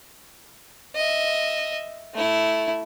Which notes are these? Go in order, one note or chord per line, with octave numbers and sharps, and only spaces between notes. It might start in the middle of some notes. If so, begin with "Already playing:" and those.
D#5 E5
A3 E4